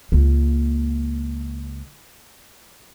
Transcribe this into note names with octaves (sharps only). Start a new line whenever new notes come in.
C#2 A#3